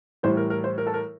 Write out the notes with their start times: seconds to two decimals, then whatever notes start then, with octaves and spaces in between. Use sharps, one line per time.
0.23 A2 E3 G3 C5
0.37 A#4
0.50 A#4
0.64 C5
0.78 A#4
0.87 A4
0.94 A#4